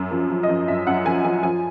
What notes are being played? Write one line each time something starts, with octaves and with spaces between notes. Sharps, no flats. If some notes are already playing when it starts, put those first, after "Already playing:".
Already playing: F#2
F3
F3
D#5
F3
F#2 E5
F#2 F#5
F3 G#5
F3 G#5
F3 G#5